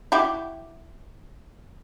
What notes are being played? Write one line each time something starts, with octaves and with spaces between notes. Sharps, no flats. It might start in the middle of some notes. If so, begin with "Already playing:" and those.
E4 F#4 G4